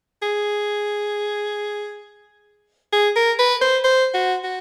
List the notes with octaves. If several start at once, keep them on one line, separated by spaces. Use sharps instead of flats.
G#4
G#4
A#4
B4
C5
C5
F#4
F#4